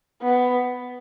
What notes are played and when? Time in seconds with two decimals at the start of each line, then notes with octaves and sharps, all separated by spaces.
0.22 B3